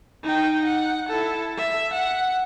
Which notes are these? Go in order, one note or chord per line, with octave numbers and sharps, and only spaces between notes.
D#4 G5
F#5
E4 A4
E5
F#5